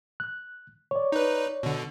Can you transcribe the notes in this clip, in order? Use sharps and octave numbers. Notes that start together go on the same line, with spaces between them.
F#6
C#5 D5
D#4 B4
B2 D3